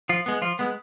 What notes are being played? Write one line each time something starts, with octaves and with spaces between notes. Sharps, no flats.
F3 F4
G#3 B3
F3 F4
G#3 B3